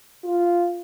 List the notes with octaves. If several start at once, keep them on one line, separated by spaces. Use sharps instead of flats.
F4